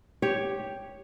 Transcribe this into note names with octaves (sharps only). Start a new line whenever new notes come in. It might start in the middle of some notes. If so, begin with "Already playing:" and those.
G4 C#5